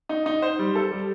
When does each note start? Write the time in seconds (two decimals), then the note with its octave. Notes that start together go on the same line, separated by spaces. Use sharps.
0.09 D#4
0.26 D#4
0.42 C5
0.59 G3
0.75 A4
0.92 G3